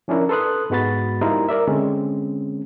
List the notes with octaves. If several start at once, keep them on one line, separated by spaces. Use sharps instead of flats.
F3 C#4 D4 E4 A#4
A4 B4 C6 D#6 F#6
G#2 G#3 B3 F#4 B5 A6
G3 A#3 D#4 E4 A#4 C5
A#4 D5 E5
D3 G#3 C4 C#4